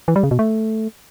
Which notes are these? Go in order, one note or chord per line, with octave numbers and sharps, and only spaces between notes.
E3
G3
C#3
B2
A3